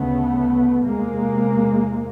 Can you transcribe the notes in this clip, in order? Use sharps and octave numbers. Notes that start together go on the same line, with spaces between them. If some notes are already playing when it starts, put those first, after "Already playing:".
Already playing: D2 C#3 A3 B3
E2 C3 G#3 A#3